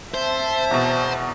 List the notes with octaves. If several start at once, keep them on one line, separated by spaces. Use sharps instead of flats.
C4 C5 E5 A5
E2 B2